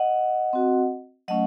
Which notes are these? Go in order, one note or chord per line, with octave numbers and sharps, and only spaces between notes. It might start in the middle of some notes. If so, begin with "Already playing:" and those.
Already playing: D#5 F#5
C4 F#4
F#3 A3 C#4 D#5 F#5